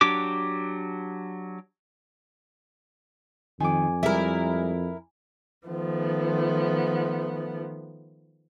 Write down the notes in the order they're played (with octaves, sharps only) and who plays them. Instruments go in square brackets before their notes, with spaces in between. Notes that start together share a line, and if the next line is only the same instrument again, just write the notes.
[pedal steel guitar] F#3 D4 G4 D6
[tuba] F2 [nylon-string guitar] D#3 [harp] G#5 D6
[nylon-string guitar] G3 G#3 [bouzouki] E4 A#4
[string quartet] D#3 F3 A3 B3